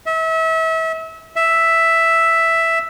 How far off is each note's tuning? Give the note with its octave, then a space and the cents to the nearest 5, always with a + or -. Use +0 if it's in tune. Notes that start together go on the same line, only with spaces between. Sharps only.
E5 -35
E5 +0